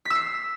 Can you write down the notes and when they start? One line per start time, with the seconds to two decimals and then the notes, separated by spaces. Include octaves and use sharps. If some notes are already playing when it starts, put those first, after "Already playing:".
0.05 B6
0.10 E6
0.15 C7